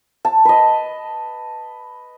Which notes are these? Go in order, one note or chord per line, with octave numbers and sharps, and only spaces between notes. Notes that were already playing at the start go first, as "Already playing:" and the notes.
A5
B4 D#5